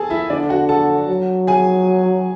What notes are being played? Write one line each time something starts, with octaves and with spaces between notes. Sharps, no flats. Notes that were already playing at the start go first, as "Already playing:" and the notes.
Already playing: G#4 A4 G#5 A5
E4 E5
D3 D4 D5
F#4 F#5
A4 A5
F#3
G#4 G#5